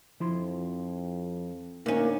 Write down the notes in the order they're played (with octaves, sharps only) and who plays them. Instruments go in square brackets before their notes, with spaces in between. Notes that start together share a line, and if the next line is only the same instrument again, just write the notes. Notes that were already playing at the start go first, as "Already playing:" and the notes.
[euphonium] F2 [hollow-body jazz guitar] F3 E4 C6
[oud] D2 C#4 [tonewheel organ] A#3 [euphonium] D#4